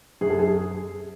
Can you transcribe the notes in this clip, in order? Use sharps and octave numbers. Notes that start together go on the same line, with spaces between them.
F#2 G#4
A4
G#4